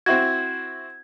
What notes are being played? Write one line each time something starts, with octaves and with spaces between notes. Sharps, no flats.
C4 E4 F#4 G#6